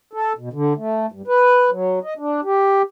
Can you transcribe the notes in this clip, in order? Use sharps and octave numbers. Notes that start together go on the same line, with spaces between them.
A4
B2
D3
A3
G2
B4
F#3
D#5
D4
G4